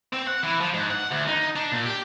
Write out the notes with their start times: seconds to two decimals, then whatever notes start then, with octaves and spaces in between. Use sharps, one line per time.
0.13 C4
0.27 F#5
0.43 E3
0.61 F3
0.74 G#2
0.91 F#5
1.12 D2
1.28 D#4
1.56 D4
1.72 A#2
1.86 G4